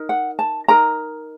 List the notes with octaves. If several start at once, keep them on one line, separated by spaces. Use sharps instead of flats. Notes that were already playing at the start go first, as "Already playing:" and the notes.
Already playing: D#4 A#4
F#5
A5
D#4 A#4 A#5